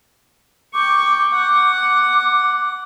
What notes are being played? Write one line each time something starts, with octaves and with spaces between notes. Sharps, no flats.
G5 C#6 D6
F#5 D6